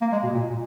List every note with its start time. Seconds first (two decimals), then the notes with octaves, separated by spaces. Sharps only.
0.01 A#3
0.12 G#3
0.24 B2
0.34 A#2
0.51 A#2